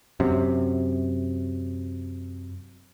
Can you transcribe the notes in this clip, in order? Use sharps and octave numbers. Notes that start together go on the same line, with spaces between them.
F#2 C3